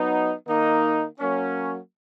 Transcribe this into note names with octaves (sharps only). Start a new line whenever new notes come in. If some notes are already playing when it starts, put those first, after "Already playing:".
Already playing: F#3 B3 D#4
D#3 A#3 D#4
F#3 A#3 C#4